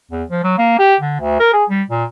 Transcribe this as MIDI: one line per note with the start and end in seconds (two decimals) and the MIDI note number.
0.11 0.24 40
0.30 0.42 53
0.44 0.55 54
0.58 0.79 58
0.79 0.95 67
1.00 1.20 50
1.20 1.36 38
1.40 1.52 70
1.53 1.65 68
1.70 1.83 55
1.90 2.04 46